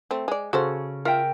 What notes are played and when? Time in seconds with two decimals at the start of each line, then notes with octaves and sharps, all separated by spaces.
0.11 A3 C4
0.28 G#3 D5
0.53 C#3 F#4 A4 C5
1.05 F4 A#4 E5 G5